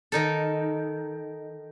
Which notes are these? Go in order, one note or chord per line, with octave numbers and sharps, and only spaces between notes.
D#3 D#4 A4